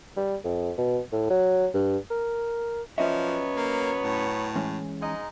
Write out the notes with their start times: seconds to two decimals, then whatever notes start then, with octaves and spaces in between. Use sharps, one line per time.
0.17 G3
0.44 F2
0.78 B2
1.12 A2
1.30 F#3
1.74 G2
2.10 A#4
2.98 F3 F#3 B3 C#4 C#5 D#5 E5
3.56 A#3
4.02 A2
4.56 E3 G#3 C#4
5.01 G#2 D#4 D#5